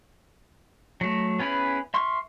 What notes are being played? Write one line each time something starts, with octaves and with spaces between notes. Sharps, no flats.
F#3 A3
B3 C#4 E4 G#4 B4
E5 C6 C#6 F6